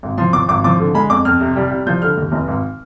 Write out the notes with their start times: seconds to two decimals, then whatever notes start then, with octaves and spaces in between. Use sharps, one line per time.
0.03 G#1
0.18 F3 C6
0.33 F3 D6
0.48 G#1 D6
0.64 F3 D6
0.79 D3
0.94 G#3 B5
1.10 F2 D6
1.25 F2 F6
1.40 C3
1.56 G3
1.71 G3
1.86 F3 G6
2.02 D3 F6
2.17 D#2
2.32 F1
2.48 G#1